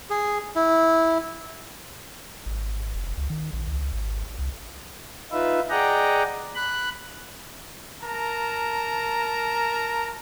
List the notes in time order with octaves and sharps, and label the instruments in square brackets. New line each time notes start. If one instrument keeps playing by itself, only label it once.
[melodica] G#4
E4
[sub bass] G#1
F1
C#2
D#3
A#1
C#2
G#1
C2
[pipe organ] D#4 F4 B4 E5
G#4 D5 D#5 F#5 G5 A#5
B5 F#6
[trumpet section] A#4 A5 A#5